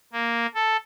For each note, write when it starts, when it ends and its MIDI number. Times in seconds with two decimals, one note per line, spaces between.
0.13 0.47 58
0.55 0.77 69